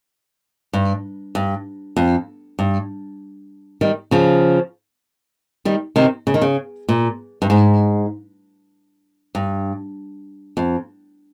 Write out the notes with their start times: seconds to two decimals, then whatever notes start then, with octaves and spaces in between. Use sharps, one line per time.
0.73 G2
1.35 G2
1.96 F2
2.59 G2
3.81 D#3 G3
4.11 C#3 F3
5.65 D#3 G3
5.96 C3 D#3
6.27 C#3
6.34 D#3
6.42 C#3
6.89 A#2
7.42 G2
7.50 G#2
9.35 G2
10.57 F2